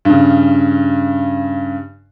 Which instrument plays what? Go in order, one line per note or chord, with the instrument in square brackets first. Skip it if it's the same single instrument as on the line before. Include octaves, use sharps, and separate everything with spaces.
[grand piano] G2 C#3